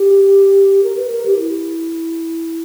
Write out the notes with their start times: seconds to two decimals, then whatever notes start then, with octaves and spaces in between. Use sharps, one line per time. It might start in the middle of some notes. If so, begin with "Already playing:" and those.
Already playing: G4
0.84 A#4
0.97 B4
1.12 A#4
1.26 G4
1.39 E4